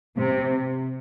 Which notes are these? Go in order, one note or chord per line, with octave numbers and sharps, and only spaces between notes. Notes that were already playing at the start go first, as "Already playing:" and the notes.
C3